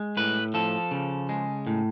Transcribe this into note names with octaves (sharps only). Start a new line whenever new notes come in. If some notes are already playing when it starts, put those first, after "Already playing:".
Already playing: G#3
A2 B4
F3 A4
C#3
G#3
A2